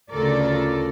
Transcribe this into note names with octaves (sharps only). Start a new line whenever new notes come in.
D2 C#3 F4 A4 A#4 D5